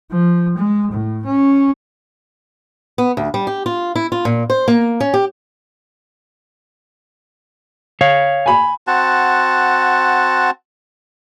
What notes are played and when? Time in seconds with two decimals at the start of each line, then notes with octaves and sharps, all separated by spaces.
0.12 F3
0.58 G#3
0.92 A2
1.25 C#4
2.98 B3
3.17 D2
3.34 G3
3.47 G4
3.66 F4
3.96 E4
4.12 F4
4.25 A#2
4.50 C5
4.68 A#3
5.00 C#4
5.14 G4
8.01 C#5 F5
8.46 G#5 B5
8.87 C4 F#4 F#5 A5